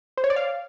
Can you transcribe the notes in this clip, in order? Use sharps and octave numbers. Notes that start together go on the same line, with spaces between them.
C5
C#5
D5
F5